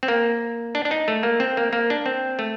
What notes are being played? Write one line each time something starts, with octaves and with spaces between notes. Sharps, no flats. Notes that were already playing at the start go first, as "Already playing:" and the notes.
C4
A#3
D4
D4
D#4
A3
A#3
C4
A#3
A#3
D4
C4
A3